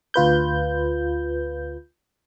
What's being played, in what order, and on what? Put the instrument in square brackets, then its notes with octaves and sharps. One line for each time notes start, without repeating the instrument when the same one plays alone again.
[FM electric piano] D2 F4 B4 G6